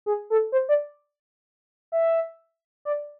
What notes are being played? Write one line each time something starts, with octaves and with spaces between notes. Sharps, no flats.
G#4
A4
C5
D5
E5
D5